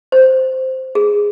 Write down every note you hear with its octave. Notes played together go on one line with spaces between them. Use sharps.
C5
G#4